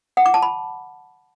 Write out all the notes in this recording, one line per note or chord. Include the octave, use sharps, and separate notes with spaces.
F#5
D6
A5
B5